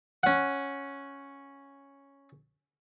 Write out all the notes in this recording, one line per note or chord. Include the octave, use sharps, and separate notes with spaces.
C#4 F#5